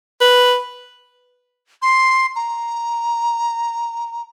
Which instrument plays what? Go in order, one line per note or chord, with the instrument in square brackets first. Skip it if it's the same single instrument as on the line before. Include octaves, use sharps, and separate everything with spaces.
[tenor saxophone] B4
[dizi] C6
A#5